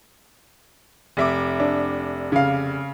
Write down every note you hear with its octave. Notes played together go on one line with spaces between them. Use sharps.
F1 E5 D6
D4
C#3 F5